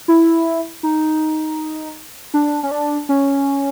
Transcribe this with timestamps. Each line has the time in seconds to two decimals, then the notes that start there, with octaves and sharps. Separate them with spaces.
0.08 E4
0.83 D#4
2.34 D4
2.63 C#4
2.71 D4
3.09 C#4